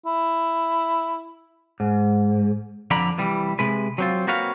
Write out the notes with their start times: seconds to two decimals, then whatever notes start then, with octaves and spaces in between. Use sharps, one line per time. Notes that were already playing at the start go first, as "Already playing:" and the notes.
0.06 E4
1.80 G#2
2.91 F2 D3 F3 D5 A#5 B5
3.18 C2 E3 G3
3.59 C3 G#3 B4
3.98 F#3 C4 F4
4.27 A#3 C4 F#4 B4 C#5 F5